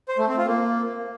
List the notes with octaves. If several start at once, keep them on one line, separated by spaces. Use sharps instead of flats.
C5
A3
C4
F4
A#3